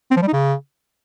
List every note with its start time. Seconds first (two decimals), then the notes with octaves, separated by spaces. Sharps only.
0.11 C4
0.17 F3
0.22 G3
0.28 D#4
0.33 C#3